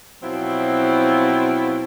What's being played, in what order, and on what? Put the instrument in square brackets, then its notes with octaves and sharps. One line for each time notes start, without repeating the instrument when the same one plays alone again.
[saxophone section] B2 F3 F#3 C4 E4